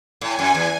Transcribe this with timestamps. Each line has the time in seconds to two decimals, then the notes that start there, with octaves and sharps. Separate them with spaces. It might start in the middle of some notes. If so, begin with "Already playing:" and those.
0.21 A2 G#5
0.39 F#2
0.55 E2